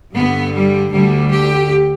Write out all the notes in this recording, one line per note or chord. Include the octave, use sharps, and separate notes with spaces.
G2 D3 B3
G3
D2 D3 G3
G4